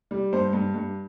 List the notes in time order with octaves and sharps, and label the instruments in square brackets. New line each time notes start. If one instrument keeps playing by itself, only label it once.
[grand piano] G3
G2 C5
G2
G2